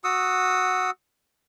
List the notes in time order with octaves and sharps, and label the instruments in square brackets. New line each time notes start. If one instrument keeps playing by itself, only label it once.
[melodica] F#4 F#5 D#6 E6